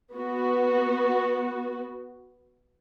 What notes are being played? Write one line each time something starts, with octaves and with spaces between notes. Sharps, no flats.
B3 F#4